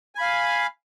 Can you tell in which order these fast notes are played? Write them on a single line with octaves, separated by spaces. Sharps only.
G#5 B5 F5